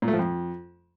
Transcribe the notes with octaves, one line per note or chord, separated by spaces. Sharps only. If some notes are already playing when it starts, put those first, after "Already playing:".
A#2
A3
F3
F2